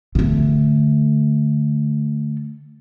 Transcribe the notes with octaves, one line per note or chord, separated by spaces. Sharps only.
D3 A3